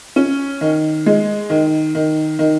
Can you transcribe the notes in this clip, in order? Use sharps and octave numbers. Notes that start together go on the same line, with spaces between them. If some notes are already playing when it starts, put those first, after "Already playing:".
C#4
D#3
G#3
D#3
D#3
D#3